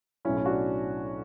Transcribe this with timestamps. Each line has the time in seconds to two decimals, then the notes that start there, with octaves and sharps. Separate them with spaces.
0.25 B1 A2 F#3 C#4 E4
0.37 E4
0.45 D4 F#4